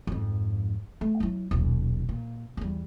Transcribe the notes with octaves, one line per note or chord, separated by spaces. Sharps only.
F2 G#2
A3
F#3 E4
D#1 B1
A#2
E2 G3